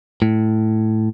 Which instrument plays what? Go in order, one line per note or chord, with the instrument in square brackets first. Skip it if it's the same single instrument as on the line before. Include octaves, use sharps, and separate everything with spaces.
[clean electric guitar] A2